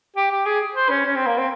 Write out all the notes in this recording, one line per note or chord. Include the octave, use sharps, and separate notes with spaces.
G4
G4
G#4
C5
C#4
C#4
C4
A#3
C4